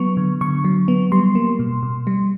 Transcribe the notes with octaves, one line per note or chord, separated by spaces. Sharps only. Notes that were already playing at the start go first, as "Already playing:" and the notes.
Already playing: F#3 B3 C#6
D3
D3 C#6
F#3
B3
G3 C6
A#3
B2
B2
G3